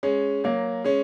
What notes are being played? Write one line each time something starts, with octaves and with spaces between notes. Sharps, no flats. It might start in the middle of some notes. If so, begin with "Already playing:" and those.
G#3 C#4
F#3 A#3
G#3 C#4